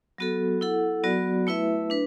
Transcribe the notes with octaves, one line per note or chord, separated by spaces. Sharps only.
F#3 B3 F#4 A4
E4 A4 F#5
F#3 B3 F#4 D5
A3 E4 B4 E5
D4 B4